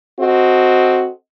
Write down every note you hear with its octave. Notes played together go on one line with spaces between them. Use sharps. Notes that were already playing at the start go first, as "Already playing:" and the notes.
C4 F#4 A4 D#5